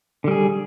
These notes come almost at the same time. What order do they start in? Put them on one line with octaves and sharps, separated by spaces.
D3 G3 G#4